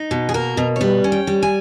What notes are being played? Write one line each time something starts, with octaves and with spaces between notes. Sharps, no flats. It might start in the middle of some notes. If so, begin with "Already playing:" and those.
Already playing: D#4
B2
G#4
A#3 A#4
B2
C#5
G3 B4
C#4
G5
G3
G#5